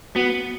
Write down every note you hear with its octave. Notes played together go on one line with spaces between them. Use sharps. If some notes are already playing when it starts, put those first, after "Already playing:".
B3 F#4